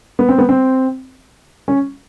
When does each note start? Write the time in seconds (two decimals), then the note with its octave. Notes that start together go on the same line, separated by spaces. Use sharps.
0.19 B3
0.29 C4
0.38 B3
0.49 C4
1.68 C#4